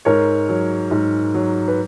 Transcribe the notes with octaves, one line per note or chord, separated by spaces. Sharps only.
G#2 A#4 C#5
F#3
G#2
F#3
B4